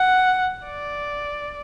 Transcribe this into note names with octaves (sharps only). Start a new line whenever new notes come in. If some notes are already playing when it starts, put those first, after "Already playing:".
Already playing: F#5
D5